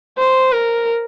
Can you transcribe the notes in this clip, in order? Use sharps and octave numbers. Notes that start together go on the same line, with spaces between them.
C5
A#4